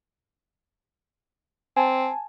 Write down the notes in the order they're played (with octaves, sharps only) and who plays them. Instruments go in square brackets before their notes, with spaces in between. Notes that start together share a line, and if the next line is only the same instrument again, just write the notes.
[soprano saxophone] C4 [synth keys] G#5 A5